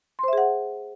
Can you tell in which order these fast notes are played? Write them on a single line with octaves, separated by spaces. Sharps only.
C6 C5 E5 G#4 F#5